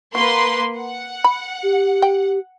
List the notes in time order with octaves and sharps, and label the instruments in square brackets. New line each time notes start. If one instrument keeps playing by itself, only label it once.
[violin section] A#3 B4 C6 [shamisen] F#4
[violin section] F#5
[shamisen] B5
[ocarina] G4
[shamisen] G5